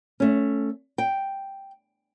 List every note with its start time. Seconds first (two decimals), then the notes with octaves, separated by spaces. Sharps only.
0.20 A3 C#4
0.98 G5